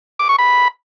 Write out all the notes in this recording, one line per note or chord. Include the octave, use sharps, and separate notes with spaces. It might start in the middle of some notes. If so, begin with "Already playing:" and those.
D6
C#6
B5